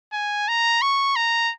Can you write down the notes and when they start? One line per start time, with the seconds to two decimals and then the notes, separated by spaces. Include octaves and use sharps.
0.13 G#5
0.48 A#5
0.82 C#6
1.16 A#5